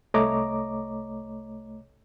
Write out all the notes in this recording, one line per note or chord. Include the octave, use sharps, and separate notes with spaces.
C2 A3 C#5 D#5 A#5 D6